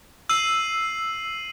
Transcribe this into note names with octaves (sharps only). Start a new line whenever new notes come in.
E6 C7 D#7 F#7